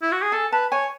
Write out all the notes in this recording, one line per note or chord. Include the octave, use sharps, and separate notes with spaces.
E4
F#4
G#4
A4 G#5
B4 A5
C#5 G#5